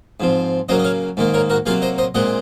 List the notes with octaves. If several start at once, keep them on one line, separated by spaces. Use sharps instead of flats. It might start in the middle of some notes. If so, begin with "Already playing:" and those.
G#2 F3 C4
C#3 F#3 A#3 C5 D#5
D#5
C#5 F5
G#2 D#3 A#3
A#4 C#5
F#4 A#4
C3 F#3 A#3 F4 G#4
C5 D#5
C5 D#5
A#2 G#3 C4 D#5 F#5